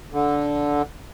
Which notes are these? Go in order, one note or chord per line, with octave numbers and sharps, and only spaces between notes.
D3